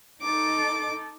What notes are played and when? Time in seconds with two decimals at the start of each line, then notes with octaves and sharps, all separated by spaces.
0.22 D#4 A4 D6